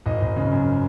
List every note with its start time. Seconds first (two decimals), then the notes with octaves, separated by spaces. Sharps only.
0.06 G#1 D#5
0.21 G#1
0.36 C#3
0.51 F#2